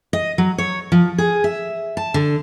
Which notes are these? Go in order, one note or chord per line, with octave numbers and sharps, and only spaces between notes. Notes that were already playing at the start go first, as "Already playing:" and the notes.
D#5
F#3
C#5
F3
G#4
E5
A5
D3